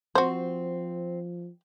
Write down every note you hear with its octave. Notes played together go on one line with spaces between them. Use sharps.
F3 C4 F#4 C5